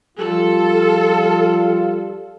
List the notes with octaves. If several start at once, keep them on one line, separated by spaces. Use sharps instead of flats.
F3 G3 F4 A4